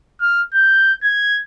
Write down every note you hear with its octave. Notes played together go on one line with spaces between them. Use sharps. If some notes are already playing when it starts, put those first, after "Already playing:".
F6
G6
G#6